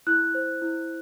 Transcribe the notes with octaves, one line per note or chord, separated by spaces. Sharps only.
E4 F#6
C5
E4